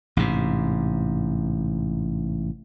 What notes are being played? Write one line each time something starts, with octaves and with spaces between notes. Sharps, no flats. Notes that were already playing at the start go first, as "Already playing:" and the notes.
A1 G#2 C3